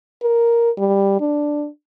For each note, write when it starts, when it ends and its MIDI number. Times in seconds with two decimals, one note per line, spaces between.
0.23 0.70 70
0.78 1.17 55
1.20 1.68 62